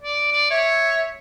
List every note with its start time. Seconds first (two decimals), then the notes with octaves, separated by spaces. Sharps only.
0.03 D5
0.32 D5
0.50 C#5 E5